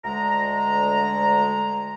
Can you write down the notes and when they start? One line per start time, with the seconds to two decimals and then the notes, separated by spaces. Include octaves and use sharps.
0.05 D2 G#3 A#5